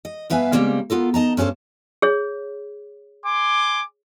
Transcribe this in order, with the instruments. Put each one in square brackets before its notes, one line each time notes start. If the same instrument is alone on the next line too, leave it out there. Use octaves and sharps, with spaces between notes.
[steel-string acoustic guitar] D#5
G2 B3 B4 E5 F5 G#5
C#3 F3 G3 G#3 A#3 C4
B3 F4 A4 A#4
D#4 D#5 A5 A#5
G2 C#4 G#4 A4 C5
[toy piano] G#4 C#5
[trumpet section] G#5 C6 D6